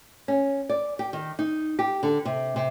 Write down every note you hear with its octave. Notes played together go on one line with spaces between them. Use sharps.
C#4
D5
G4
D#3
D#4
G4
D3
C3
C3